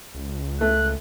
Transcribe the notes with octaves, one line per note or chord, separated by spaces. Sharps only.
C#2
A3 F#6